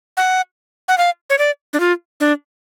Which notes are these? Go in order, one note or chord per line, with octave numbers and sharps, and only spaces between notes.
F#5
F#5
F5
C#5
D5
D4
F4
D4